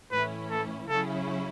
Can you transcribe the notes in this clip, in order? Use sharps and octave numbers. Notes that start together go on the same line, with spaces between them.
A2 E3 C#4 E4 B4
A4
C#3 F#3 C#4 E4 A4